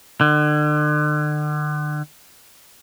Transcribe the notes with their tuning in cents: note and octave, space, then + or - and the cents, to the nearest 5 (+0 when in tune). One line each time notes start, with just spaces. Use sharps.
D3 +40